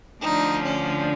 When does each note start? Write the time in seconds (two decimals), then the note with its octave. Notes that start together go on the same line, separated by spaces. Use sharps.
0.22 D2 D3 F3 D#4
0.64 C#4